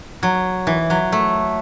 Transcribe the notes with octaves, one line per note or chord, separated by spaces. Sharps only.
F#3
E3
F#3
A3